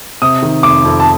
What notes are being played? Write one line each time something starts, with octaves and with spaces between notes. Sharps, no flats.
C3 D#6
D#3
F1 D6
F2
A5